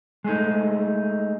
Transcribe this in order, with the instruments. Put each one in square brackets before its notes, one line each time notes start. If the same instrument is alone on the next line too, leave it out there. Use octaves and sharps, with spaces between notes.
[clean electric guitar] G#3 A3 D#4